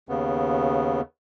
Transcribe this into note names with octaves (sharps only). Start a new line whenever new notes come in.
D#2 C#3 B3